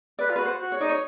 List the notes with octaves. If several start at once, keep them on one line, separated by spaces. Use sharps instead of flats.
B4 D5
F4
F#4 B4
C5
F#4
C#5
D#4 D5
C#5